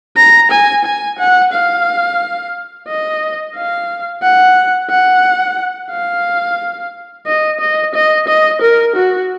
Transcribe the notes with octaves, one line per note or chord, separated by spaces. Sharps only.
A#5
G#5
G#5
F#5
F5
D#5
F5
F#5
F#5
F5
D#5
D#5
D#5
D#5
A#4
F#4